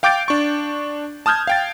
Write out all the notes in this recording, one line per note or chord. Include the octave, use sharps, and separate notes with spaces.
F5 G5 D6 G6 A6 D7
D4 C#6
A5 D#6 F6 G6 G#6
F5 G5 A6